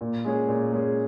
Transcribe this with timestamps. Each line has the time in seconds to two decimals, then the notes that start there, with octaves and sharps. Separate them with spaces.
0.01 A#2
0.24 G#3 C#4 G#4
0.48 A#2
0.72 G#3 C#4 G#4